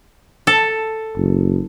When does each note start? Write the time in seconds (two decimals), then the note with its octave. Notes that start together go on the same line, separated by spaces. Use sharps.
0.47 A4
1.17 F#1